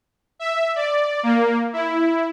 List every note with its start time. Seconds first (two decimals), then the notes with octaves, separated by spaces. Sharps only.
0.39 E5
0.76 D5
1.23 A#3
1.73 E4